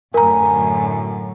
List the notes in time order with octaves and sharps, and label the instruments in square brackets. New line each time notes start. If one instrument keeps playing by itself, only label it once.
[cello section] F#2 A2 D3 [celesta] A#4 A#5 [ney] G#5